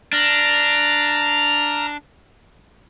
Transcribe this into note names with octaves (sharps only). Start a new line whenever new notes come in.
D4 A#5 F6